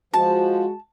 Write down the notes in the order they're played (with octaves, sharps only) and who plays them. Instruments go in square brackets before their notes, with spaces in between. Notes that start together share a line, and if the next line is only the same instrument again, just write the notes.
[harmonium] F3 [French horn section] G#3 F#4 [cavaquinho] A5